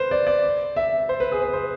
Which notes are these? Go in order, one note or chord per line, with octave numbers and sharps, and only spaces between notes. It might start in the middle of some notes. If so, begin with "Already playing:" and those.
Already playing: B4 C5
D5
D5
E5
C5
B4
G#4
B4
C5